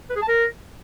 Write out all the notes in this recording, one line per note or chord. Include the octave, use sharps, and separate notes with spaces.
B4
G#4
A5
A#4